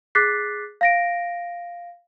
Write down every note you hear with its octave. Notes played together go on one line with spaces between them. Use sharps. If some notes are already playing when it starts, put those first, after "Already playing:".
G#4 D6 F#6 A6 B6 C7
F5 A#6 D7